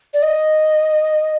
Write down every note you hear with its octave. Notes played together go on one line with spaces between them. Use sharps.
D5
D#5